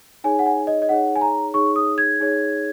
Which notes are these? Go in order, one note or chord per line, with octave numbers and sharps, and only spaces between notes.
D#4 G#4 C#5 G#5
F#5
G#5
D#5
D#5
D#4 G#4 C#5 F#5
G#5
A#5
D#4 G#4 C#5 C#6
D#6
G#6
D#4 G#4 C#5